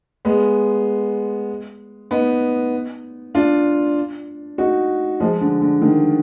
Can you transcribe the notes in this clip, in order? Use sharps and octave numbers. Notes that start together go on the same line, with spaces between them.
G#3 B3
B3 D#4
D4 F4
D#4 F#4
F3 G#3
D3
D3
D#3